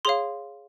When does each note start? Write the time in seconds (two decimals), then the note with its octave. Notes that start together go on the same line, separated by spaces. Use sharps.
0.05 G#4 C#5 F5 C6